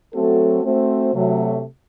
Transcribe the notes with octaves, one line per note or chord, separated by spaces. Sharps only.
F#3 A3 C4 F#4 A4
A3 C4 F#4 C5
C3 F#3 A3